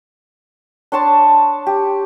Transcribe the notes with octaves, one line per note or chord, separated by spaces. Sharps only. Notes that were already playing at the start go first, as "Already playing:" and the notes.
D4 C#5 A5 C6
G4